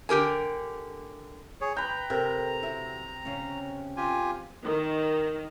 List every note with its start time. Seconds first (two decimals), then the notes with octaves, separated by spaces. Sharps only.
0.09 D3 G4 A#4 G#5
1.61 G#4 C#5
1.77 B4 G5 A#5
2.10 C3 A4 A#4
2.63 E4 F#4 E5
3.25 C#3 C#4
3.97 F4 G4 G#5
4.64 D#3